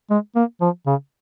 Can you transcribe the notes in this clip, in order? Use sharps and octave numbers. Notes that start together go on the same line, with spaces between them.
G#3
A#3
F3
C#3